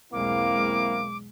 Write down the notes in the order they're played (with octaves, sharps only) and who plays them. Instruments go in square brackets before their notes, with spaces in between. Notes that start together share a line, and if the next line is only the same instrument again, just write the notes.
[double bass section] B1 E2 G#3 [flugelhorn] A#3 [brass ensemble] C4 E4 F5 [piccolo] D6